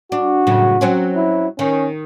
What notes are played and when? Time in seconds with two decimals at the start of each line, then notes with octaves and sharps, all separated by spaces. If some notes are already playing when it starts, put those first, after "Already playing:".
0.12 D4 F#4
0.47 F#2 A2 C#3
0.81 F#3 C4 C#4
1.16 E4
1.59 D#3 C#4